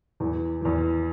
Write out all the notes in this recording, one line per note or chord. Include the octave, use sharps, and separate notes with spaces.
E2 E3
E2 E3